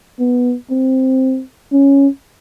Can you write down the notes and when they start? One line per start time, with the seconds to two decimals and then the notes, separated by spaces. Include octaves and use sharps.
0.19 B3
0.70 C4
1.72 C#4